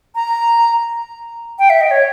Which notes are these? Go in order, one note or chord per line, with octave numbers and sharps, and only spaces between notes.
A#5
G5
E5
D#5
C#5